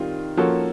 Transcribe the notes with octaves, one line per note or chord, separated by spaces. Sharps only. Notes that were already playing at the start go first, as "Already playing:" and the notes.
Already playing: D#3 G3 C4 F4
F3 A#3 C#4 F#4 A4